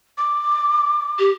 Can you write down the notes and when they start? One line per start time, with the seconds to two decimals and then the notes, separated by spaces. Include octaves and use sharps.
0.18 D6
1.19 G4